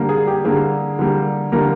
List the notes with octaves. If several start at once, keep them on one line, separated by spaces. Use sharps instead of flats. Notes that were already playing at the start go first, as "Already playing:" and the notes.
Already playing: D3 G3 A#3
G#4
G4
D3 G3 A#3 G#4
D3 G3 A#3
D3 G3 A#3 A#4